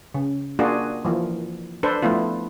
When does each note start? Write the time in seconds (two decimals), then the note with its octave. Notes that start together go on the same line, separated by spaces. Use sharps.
0.14 C#3
0.59 A#3 D4 F4 F#4 G#4
1.05 E3 F3 A#3
1.83 D4 A4 B4 C5
2.03 F3 A3 B3 E4 F4